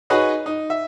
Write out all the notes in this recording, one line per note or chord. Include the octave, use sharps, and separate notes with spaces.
D#4 F#4 G#4 B4 C#5 D#5
D#4
E5